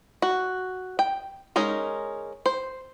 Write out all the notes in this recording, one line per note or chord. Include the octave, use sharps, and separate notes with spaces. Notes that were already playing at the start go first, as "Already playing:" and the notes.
F#4
G5
G#3 C#4 D#4 A#4
C5